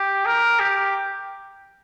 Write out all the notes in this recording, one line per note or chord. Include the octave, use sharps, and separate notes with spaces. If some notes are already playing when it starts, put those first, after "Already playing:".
Already playing: G4
A#4
G4